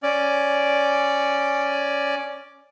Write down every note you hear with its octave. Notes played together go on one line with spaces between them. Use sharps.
C#4 D5